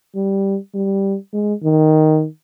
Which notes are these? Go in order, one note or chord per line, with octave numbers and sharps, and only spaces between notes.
G3
G3
G#3
D#3